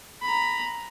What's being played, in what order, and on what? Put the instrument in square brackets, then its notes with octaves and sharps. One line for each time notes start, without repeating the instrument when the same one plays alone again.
[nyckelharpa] A#5 B5